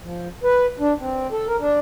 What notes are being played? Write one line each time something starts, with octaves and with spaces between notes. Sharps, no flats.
F3
B4
D4
C4
A4
A#4
D4